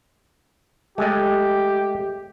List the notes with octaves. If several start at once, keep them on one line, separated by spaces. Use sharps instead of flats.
G#3 A3 G4 D#5